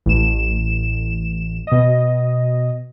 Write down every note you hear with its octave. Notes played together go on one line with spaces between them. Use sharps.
A1 E7
B2 D#5